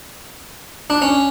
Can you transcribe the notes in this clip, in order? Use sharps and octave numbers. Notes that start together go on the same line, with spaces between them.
D4
C#4